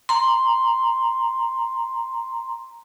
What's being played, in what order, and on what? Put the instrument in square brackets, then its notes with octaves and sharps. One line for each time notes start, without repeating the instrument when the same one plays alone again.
[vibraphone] A#5 C6